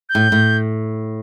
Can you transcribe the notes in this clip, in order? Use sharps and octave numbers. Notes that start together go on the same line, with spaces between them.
G6
A2
A2